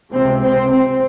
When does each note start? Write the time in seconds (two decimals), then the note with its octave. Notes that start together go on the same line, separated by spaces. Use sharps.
0.12 C#2 C3 C4
0.42 C4
0.72 C4